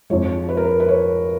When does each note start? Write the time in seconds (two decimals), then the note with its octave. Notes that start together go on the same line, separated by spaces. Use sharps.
0.10 F2 F3 G#3 C#5
0.49 B4
0.57 A#4
0.64 B4
0.80 B4
0.89 C#5